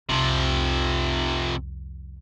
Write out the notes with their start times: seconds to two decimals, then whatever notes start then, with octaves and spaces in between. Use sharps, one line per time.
0.09 C2 F2 C3 F3